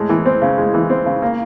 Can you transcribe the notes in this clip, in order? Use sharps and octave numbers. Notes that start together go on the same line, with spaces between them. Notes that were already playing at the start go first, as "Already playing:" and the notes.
Already playing: A2 G#3
E3
C4
C#3
G#3
E3
C4
C#3
A#3